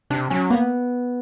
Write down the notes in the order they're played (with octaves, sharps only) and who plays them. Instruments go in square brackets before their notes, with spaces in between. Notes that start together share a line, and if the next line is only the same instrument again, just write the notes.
[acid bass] C3 [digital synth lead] D4
[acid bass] F#3 [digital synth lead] C#4
[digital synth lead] A#3 [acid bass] B3